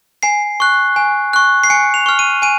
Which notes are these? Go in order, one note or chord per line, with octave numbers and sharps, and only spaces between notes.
G#5 C7
C#6 F#6
G#5
C#6 F#6
C7
G#5 C#7
F7
C#6 F6
D#7
G#5 D#7